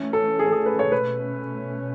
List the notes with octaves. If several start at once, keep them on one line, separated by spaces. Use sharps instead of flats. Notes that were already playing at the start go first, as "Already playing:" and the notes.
Already playing: E3 A3 C#4
A4
G#4
A4
G#4
B4
C#5
B2 A3 C#4 B4